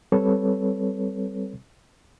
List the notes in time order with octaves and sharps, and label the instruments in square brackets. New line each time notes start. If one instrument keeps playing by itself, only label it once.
[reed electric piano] G3 C4 A4 B4 C#5